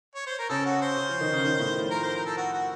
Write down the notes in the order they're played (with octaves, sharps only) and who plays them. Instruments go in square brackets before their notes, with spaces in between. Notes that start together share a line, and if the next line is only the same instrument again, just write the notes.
[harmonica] C#5
C5
A#4
[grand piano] C#3 C#4 [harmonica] A4
[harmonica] F#4
C5
[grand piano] C#3 C#4
F3 F4
D#3 D#4
C#3 C#4
D#3 D#4
A2 A3
F3 F4
[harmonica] A#4
C5
A#4
A4
F#4
F#4